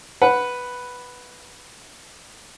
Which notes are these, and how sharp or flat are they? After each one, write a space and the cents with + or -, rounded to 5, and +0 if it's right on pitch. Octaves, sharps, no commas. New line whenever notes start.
B4 +0 F#5 +0